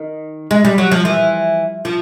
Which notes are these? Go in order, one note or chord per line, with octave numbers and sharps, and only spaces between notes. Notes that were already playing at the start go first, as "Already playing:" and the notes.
Already playing: D#3
G#3
G3
F#3
F3
E3
F3